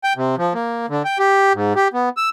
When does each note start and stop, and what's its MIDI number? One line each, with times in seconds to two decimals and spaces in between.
0.04 0.13 79
0.17 0.35 48
0.38 0.53 53
0.54 0.86 58
0.89 1.03 50
1.05 1.18 79
1.19 1.53 67
1.54 1.73 44
1.76 1.88 67
1.94 2.09 59
2.17 2.29 88